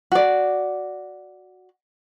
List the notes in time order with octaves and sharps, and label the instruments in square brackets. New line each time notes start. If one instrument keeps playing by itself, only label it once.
[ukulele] F#4 D5